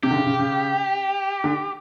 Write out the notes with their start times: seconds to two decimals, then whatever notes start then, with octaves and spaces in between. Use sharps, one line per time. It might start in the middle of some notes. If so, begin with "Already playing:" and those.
0.03 C3 G4
0.11 D3
0.16 C#3
0.26 C#3
0.39 C#3
1.44 D3